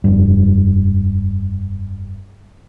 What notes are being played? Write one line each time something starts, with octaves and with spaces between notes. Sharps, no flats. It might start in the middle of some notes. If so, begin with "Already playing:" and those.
F1 G2